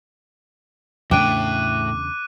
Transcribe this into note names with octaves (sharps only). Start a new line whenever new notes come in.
E2 A2 C#3 D4 G5 D6 F#6 D#7